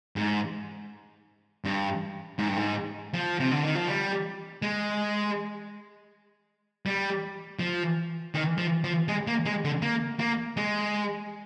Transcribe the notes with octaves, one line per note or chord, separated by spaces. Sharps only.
G#2
G2
G#2
G2
G#2
F3
C3
D3
D#3
F3
G3
G#3
G3
F3
D#3
F3
F3
G#3
A#3
G#3
D3
A#3
A#3
G#3